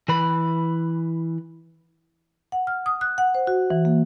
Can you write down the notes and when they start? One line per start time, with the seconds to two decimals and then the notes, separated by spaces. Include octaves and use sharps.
0.08 E3 B4 B5
2.52 F#5
2.67 F6
2.86 D#6
3.01 F#6
3.18 F#5
3.35 C5
3.47 F#4
3.70 E3
3.85 A#3